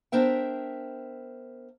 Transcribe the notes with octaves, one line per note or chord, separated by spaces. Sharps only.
B3 D4 A#4 C5 E5 G5